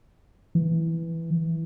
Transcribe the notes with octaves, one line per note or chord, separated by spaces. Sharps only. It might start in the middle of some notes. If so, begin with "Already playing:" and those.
E3